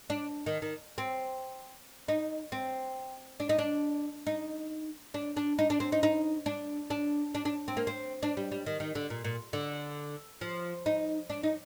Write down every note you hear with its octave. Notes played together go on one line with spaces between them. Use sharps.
D4
D#3
D#3
C4
D#4
C4
D4
D#4
D4
D#4
D4
D4
D#4
D4
C4
D#4
D#4
D4
D4
D4
D4
C4
A#3
C4
D4
G3
G3
D#3
D#3
D3
A#2
A#2
D3
F3
D#4
D4
D#4